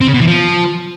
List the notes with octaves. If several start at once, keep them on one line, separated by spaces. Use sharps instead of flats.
C4
C#3
B2
E3
F3